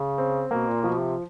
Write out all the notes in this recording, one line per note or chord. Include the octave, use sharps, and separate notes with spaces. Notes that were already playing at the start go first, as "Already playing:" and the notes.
Already playing: C#3
C4
B2 A#3
A#2
B2 F3
C3